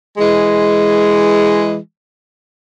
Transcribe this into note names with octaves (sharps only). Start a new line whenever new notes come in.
E3 G#3